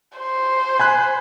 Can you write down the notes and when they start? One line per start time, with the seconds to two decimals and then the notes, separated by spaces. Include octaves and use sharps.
0.18 C5
0.80 G#5 B5 F#6